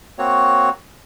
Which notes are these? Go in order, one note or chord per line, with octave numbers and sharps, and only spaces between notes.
A#3 C4 F#4 C#5